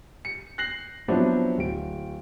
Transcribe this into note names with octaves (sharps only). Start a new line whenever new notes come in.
C#7
F#6 A#6 C7 F#7
F3 F#3 B3 C4 D4 E4
D1 D7